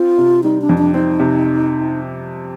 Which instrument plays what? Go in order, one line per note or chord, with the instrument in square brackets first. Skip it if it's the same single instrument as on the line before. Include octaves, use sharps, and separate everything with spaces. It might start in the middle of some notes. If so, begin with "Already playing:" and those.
Already playing: [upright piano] C4 [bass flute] F4
[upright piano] C3
[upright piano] G3 [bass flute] D#4
[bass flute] D4
[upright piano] F2
[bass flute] D4
[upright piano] C4 [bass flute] D#4
[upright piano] C3